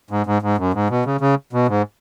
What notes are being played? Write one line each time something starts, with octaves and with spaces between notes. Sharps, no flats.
G#2
G#2
G#2
F#2
G#2
B2
C#3
C#3
B2
G#2